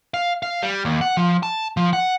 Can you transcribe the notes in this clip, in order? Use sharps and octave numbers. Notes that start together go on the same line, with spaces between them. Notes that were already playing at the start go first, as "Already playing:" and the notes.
F5
F5
G3
D#2
F#5
F3
A5
F3
F#5